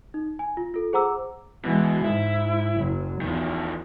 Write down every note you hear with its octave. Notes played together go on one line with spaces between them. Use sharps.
D#4
G#5
F4
F4 A4
G#4 C5 F#5 A#5 D6 E6
B2 E3 G#3
G#2 E4
F#1 F#3
E2 D#3 F3